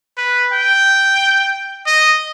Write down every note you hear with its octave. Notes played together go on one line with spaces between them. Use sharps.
B4
G5
D#5